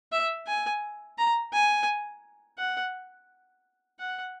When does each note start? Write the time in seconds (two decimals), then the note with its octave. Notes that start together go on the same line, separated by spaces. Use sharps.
0.12 E5
0.47 G#5
1.18 A#5
1.53 G#5
2.58 F#5
3.99 F#5